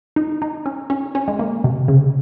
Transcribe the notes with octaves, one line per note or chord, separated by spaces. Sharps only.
D#4
D#4
C#4
C#4
C#4
G#3
A#3
C3
C#3